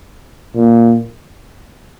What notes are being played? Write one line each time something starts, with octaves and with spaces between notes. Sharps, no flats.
A#2